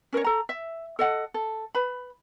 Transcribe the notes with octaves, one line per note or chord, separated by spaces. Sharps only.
C#4 A#4 B4 C#5
A4 A#5
E5
A4 D#5 F#5
A4
B4 B5